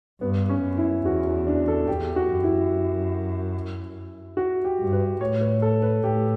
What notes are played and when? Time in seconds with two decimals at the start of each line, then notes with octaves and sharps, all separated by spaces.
0.21 G2 B3
0.49 C#4
0.63 F#2
0.78 E4
1.05 E2 F#4
1.47 D4
1.68 A4
1.87 E2 G4
2.16 F#4
2.30 F#2
2.44 E4
4.37 F#4
4.65 G4
4.79 G2
4.93 B4
5.21 A2 C#5
5.41 B4
5.62 A4
5.82 B4
6.03 A2 G4